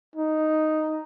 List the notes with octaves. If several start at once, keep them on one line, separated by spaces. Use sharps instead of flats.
D#4